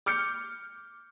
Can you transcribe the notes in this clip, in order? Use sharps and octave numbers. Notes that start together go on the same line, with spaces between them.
D6 F6 G6 C#7